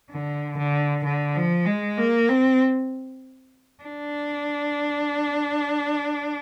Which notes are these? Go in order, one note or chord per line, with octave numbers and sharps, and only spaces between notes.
D3
D3
D3
F3
G#3
A#3
C4
D4